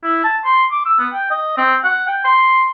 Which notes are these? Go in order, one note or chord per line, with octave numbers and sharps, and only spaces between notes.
E4
A5
C6
D6
E6
B3
G5
D#5
C4
F#5
G5
C6